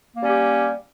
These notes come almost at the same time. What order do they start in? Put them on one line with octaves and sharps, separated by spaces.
A#3 G3 C#4 G4